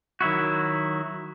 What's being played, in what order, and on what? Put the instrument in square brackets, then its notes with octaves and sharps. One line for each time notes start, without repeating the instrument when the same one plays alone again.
[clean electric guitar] D#3 F#3 E4 F#4